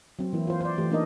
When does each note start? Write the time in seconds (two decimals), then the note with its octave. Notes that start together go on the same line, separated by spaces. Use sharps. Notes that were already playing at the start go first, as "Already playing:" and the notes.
0.19 F#3 C4
0.33 E3 A#3 E4
0.47 F4 C5
0.61 C5 D5
0.78 E3 A3 G4
0.90 A3 A#3 D4 D#4 A#4 D#5